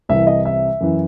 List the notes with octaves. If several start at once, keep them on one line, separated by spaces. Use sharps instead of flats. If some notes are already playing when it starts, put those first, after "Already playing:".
C2 C3 E3 E5
D#5
E5
F#2 E3